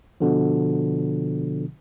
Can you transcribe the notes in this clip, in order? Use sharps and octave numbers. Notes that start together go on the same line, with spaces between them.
B2 D3 F3